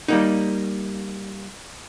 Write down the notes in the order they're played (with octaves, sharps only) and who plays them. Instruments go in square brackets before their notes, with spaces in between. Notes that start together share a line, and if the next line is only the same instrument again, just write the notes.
[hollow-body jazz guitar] G3 A#3 D#4